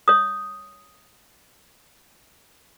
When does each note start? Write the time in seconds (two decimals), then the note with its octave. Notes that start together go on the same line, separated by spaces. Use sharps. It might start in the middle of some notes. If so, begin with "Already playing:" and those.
0.08 C#5 D#6